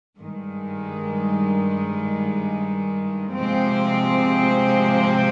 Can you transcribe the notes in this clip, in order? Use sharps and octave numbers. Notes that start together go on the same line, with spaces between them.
G2 D#3 G#3
C3 F3 G#3 C4